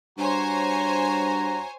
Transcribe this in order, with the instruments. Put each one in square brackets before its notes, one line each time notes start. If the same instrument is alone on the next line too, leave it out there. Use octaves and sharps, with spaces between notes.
[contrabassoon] G2 [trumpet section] F#4 A#5 [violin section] C5 C#5 G#5